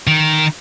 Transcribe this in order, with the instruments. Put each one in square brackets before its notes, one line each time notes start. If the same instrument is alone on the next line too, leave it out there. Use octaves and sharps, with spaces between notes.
[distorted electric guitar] D#3